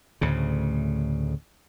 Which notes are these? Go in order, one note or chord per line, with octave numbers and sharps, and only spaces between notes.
D2 A2 C#3